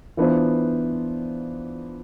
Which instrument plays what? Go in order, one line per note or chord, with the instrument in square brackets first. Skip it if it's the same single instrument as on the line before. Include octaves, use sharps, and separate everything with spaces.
[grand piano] E3 B3 D4 F4 C5